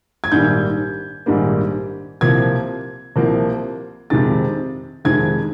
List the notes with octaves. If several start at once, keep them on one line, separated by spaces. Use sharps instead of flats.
G#6
A#1 G#2 D#3 G3 A#3 G6
A#1 G#2 D#3 G3 A#3
C2 C3 F3 A#3 G#6
C2 C3 F3 A#3
F2 C3 D#3 G#3 A6
F2 C3 D#3 G#3 G#6